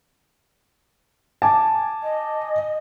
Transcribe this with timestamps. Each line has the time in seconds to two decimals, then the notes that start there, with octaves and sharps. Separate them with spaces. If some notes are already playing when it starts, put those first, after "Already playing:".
1.42 G#5 A5 D6
2.03 D#5